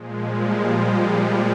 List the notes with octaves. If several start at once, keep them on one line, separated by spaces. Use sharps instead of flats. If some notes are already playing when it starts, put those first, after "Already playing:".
Already playing: A#2 F3 G#3
G3
G3